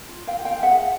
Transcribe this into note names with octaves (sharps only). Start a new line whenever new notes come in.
F4
F5 G5
F4
F5 G5
G#4 E5 F#5